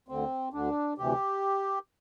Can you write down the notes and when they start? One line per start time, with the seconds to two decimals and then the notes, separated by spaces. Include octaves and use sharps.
0.08 D2 D3 C4
0.53 D2 D3 D4
0.98 D2 C3 E3 G4